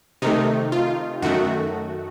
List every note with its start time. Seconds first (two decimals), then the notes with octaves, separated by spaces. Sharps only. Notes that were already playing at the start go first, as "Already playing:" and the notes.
0.22 C3 D#3 A3 D#4
0.72 F4
1.22 F#2 D#3 A3 F#4